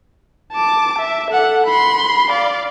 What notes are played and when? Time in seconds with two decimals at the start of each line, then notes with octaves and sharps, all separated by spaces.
0.53 A5 D6
0.99 E5
1.31 A4 F#5
1.67 B5 C6
2.31 D5 F5